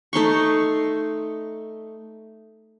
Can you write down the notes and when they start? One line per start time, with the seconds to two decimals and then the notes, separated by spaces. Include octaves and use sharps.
0.13 A3 D#4 C6 C#6